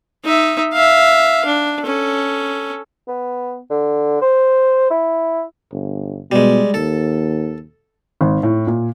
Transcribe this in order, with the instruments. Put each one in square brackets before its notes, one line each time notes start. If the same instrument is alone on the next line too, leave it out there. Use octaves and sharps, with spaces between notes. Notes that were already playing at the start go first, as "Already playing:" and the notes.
[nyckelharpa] D#4 E5
E5 F5
D4
C#4 A4
[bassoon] B3
D3
C5
E4
[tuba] G1
[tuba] B2 [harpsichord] G3 G#3
[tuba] D#2 [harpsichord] A4
[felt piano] G#1
A2
A#2